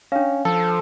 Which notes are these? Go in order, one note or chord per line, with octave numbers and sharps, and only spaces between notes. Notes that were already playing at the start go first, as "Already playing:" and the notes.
C#4 D4 F5
F3 A4